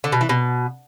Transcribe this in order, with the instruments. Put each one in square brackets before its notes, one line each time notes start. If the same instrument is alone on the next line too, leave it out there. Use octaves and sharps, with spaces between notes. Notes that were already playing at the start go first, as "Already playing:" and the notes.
[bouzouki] D3
B2
E3
B2